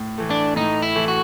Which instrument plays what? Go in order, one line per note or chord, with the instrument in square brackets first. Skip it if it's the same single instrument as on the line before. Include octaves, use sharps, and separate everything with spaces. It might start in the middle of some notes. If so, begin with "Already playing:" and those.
Already playing: [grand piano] A2
E3 A3
[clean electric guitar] D4
[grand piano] A2 [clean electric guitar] D#4
[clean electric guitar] E4
[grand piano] E3 A3
[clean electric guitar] F#4